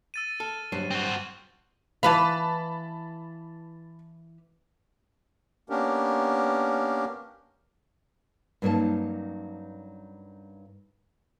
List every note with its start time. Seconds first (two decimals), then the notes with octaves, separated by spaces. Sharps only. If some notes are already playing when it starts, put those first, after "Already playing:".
0.14 E6 A6 D#7
0.40 A4 F6
0.72 G2 F#3 C5
0.91 C4 F#4
2.03 E3 B4 F5 A5 B5
5.70 A#3 B3 C#4 D4 G4 A#4
8.62 G2 F#3 A#3 C#4 D#4 A5